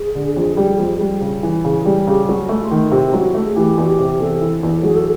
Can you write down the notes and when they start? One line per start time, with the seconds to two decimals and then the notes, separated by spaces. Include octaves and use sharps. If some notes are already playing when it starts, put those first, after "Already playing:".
Already playing: G#4
0.15 D3
0.36 F2
0.57 G3
0.79 F2
1.01 G3
1.22 C#3
1.43 E3
1.65 C#3
1.85 G3
2.07 C#3 G4
2.28 F#3 F#4
2.49 A3
2.61 F4
2.71 D#3
2.91 C3 F4
3.01 E4
3.11 F#3 D#4
3.19 E4
3.35 A3
3.45 G#4
3.55 E3 G4
3.78 E2 F#4
3.88 G4
3.99 C3
4.19 E2 A4
4.41 E3
4.63 E2
4.83 F#3 G#4
4.96 A4